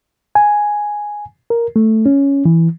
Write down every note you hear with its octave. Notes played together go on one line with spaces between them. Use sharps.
G#5
A#4
A3
C#4
E3